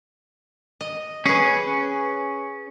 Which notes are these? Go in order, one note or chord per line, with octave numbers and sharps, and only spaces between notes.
D#5
C#4 G#4 B4